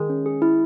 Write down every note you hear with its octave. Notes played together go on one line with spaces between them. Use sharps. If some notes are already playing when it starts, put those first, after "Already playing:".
Already playing: D#3 G#3
C#4
G#4
E4